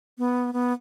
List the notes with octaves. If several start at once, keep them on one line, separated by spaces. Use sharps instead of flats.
B3
B3